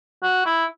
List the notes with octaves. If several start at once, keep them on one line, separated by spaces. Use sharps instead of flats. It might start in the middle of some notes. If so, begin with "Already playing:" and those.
F#4
E4